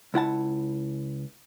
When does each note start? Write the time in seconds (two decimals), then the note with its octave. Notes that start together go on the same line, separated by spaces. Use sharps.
0.14 C#2 E4 F#5 A5